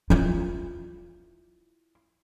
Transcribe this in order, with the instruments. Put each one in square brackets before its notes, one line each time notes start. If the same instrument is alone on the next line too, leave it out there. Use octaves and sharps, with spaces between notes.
[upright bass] E4 F4